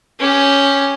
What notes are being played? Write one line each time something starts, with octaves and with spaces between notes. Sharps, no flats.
C#4 G4